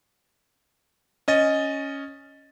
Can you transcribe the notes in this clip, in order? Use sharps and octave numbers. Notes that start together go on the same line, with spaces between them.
C#4 D#5 A6